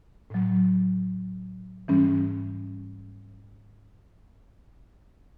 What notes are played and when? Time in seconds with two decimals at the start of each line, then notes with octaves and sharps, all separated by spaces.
0.30 A2 F#3
1.88 G#2 E3 G3 C#4